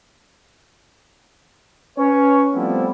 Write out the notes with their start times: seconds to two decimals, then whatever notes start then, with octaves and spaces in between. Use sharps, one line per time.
1.98 C#4 B4 C#5
2.54 F3 G3 A3 B3 C4 E4